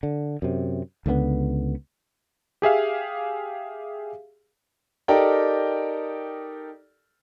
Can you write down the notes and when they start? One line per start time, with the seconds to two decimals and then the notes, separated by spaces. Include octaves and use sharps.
0.03 D3
0.42 F#2 C3
1.06 C#2 D3 E3 B3
2.62 G4 G#4 E5 F5
5.08 D#4 G4 A4 A#4 D5 G5